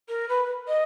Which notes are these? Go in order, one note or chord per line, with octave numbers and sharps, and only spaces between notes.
A#4
B4
D#5